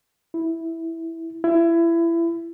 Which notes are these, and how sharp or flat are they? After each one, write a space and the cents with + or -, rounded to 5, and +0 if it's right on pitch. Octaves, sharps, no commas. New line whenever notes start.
E4 -5
E4 +25